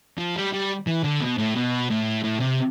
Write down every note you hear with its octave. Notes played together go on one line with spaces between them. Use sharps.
F3
G3
G3
E3
D3
B2
A2
B2
A2
A2
C3